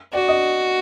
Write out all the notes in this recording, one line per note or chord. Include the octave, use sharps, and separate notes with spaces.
F#4 D5
D#5